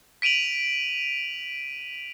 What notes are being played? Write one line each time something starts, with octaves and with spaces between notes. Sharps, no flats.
B6 D7 D#7 F7 F#7